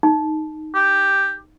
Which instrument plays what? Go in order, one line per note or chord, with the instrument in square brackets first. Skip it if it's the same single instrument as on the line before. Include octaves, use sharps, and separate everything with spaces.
[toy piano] D#4
[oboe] G4